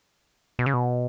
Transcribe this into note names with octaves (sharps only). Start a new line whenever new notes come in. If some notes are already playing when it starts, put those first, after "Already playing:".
B2
C#3
B2